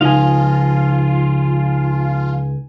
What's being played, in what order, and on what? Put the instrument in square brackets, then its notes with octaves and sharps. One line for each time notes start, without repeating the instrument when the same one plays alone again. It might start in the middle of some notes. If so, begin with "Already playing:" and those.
[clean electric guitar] C#2 [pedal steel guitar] F3 D#5 F5 [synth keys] D#4 G#5 [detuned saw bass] F4